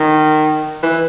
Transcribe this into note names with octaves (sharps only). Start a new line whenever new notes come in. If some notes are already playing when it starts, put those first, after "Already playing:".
Already playing: D#3
E3